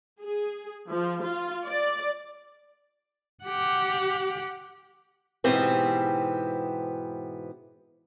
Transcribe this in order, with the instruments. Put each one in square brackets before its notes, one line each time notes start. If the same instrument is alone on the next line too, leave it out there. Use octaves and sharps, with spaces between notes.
[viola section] G#4
F3
F4
D5
[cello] G4 F#5
[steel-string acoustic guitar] G#2 B2 E3 B3 C4 G4